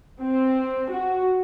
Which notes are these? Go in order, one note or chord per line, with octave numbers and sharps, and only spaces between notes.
C4
F#4